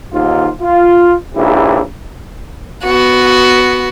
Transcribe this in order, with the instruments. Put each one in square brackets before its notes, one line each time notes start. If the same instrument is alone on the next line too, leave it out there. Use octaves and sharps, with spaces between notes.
[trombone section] D#2 G#2 F4
F4
A#1 G#2 C#3 E3 E4 G4
[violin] B3 F#4